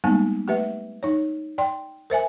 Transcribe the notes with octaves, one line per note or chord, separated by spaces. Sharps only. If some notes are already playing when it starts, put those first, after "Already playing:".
G3 G#3 A#3 B3 D#4
A3 G4 B4 E5
D#4 C#5
D5 G5 C6
A#4 C5 E5 G#5